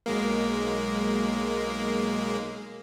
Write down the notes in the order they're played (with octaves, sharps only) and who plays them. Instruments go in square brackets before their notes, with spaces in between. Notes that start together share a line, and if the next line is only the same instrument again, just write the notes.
[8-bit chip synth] B1 G#3 A#3